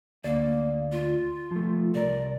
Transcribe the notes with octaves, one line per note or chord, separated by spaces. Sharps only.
D2 A#3 D5
F4
F3 A3
C2 A#4 D5